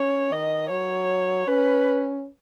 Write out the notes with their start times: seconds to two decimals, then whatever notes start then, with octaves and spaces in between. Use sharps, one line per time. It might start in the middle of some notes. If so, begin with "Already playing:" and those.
Already playing: C#4 C#5
0.32 D#3 D#5
0.70 F#3 C#5
1.47 C#4 B4